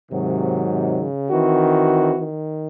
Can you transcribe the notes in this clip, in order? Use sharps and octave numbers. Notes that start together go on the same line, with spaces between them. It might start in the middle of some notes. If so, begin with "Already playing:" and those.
G#2 C3 D#3 F#3
C3
C#3
D#3 E3 C4 F#4
D#3